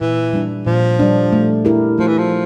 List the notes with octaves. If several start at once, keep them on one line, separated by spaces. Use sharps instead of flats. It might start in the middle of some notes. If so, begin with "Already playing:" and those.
A#2 E3
G3 D4
A#2 F3
G3 D4
A3
E4 G4 A#4
F3 A3
E3
F3